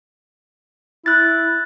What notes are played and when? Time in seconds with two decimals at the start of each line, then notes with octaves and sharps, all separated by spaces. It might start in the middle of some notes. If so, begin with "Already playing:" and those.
1.06 E4 F#6 A6